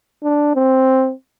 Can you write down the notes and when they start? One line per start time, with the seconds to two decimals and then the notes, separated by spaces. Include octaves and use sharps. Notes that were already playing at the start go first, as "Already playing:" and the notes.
0.23 D4
0.55 C4